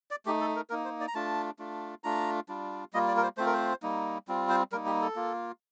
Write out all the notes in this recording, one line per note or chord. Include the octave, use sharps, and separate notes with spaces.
D5
A3 D#4 G4
A4
A#4
A#3 D#4 A#4
C5
D5
A#5
A3 D4 F4 A5
A3 D4 F4
A3 D4 F4 A#5
G3 D4 F4
G3 A#3 F4 D#5
D5
A#4
C5
A3 C4 F4 C5
A#4
C5
G3 A#3 D#4
G3 C4 F4
C5
G3 A#3 D#4 A#4
G4
A4
A#3 F4